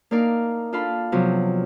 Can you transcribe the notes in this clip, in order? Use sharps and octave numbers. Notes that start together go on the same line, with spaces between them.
A#3 D4 D#4 A#4 D5 F5
D4 F4 A4 F5 A5 B5
C3 F3 F#3 B3